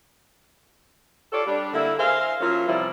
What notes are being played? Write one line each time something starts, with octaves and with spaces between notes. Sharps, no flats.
F4 G4 A4 C#5 D5
G3 D4
D3 A#3 E4
G#4 A#4 C5 E5 F5
F3 F#3 A#3 C#4 E4 F4
C3 E3 F3 G3 E4